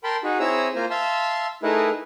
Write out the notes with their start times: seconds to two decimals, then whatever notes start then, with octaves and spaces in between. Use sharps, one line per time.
0.04 A#4 G5 A5 B5 C6
0.24 D#4 F#4 G#4
0.40 C4 E4 G#4 C#5 A#5 E6
0.75 A#3 F4 C5 G#5 A#5
0.90 E5 F5 A5 C6 E6
1.63 A3 D#4 E4 G#4 A#4 B4